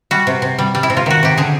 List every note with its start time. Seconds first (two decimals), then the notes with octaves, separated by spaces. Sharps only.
0.11 G3 F#4
0.27 C3
0.42 C3
0.58 G3
0.75 G3
0.83 E4
0.90 C3
0.97 F4
1.06 D#3 F#4
1.23 C3 G4
1.37 D3 G#4